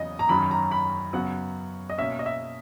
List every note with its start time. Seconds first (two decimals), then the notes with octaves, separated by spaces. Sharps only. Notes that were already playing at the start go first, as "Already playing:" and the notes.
Already playing: E2 C#3 F#3 D#5
0.19 A#5
0.29 F#2 D#3 F#3 B5
0.51 A#5
0.71 B5
1.13 F#2 C#3 F#3 B3 F#5
1.90 D#5
1.98 B2 A#3 C#4 E5
2.19 D#5
2.26 E5